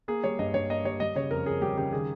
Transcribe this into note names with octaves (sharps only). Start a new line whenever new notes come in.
A#3 G#4
G3 C#5
G2 D#5
G2 C#5
A#3 D#5
G3 C#5
G3 D#5
C#3 C#5
F2 A#4
F2 G#4
G3 G4
C#3 G4
D#3 G#4